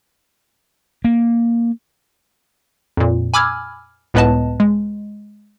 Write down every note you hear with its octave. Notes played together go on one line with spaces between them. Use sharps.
A#3
F2 A#2
G#5 B5 D6 E6 F6 G#6
C#2 A2 B3 B4 D#5 A5
G#3